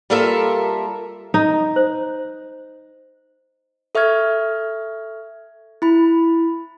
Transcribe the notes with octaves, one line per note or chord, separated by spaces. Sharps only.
G3 A#3 F4 A4 A#4 E5
D#4
C5
A4 E5 C#6 F6 G#6
E4 B5